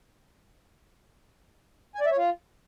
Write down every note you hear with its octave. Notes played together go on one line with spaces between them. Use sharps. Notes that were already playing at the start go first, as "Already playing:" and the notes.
G#5
D5
E5
C#5
F4